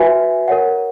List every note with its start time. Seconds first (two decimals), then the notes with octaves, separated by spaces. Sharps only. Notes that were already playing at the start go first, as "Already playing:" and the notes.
Already playing: F#4 B4 E5 G#5
0.48 A#4 C#5 F#5